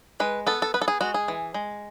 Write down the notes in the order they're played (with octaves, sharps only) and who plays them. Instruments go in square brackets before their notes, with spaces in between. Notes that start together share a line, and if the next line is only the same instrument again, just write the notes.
[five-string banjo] G#3 B4
B3 A4
A4
B3 B4
A4
G#4
G#3 F#4
G#4
E3
G#3